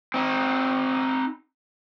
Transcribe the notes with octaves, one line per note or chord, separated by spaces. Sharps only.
C4 D#4